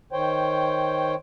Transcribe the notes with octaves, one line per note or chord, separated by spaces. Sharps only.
D#3 C5 C#5 G5